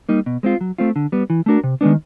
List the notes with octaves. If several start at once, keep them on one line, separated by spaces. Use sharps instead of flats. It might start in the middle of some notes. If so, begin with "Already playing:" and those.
G3 A#3 D#4
B2
G#3 C4 F4
F#3
A3 C4 F4
D3
G3 B3
E3
A3 D4 F#4 A#4
C3
D#3 G#3 B3 D4